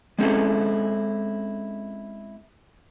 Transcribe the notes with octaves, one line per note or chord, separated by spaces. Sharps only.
G#3 C4 C#4 E4 A4